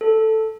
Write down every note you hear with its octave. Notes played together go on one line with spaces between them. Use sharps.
A4